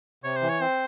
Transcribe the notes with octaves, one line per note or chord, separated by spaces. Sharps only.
C3 C#5
C5
E3
C#5
C4 C5